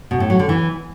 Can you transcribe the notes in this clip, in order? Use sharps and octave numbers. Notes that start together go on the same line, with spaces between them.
B2
A2
F#3
D3
E3